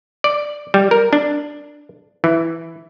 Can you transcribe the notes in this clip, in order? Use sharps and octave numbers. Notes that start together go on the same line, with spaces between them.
D5
G3
A#4
D4
E3